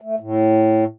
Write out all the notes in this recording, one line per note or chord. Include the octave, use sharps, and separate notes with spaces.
A3
A2